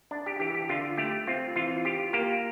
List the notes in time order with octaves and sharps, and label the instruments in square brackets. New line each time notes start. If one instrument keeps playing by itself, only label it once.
[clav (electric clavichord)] D4
G4
E3 G4
G4
D3 F4
A3 G4
C4 F4
E3 F4
F4 G4
A#3 G4